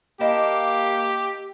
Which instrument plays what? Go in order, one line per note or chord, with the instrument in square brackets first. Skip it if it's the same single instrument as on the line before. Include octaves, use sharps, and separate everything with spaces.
[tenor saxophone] A#3 [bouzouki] E4 D#5 A5 [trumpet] G4